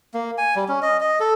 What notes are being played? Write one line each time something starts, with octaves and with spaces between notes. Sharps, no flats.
A#3
G#5
G3
C#4
D#5
D#5
A4